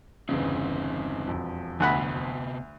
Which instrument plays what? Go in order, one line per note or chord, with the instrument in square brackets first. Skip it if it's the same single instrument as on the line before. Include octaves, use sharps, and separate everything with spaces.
[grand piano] G1 E2 C#3 [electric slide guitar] C4 D#4
[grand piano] E1 F2
[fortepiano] D2 F#5 B5 [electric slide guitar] C3 B3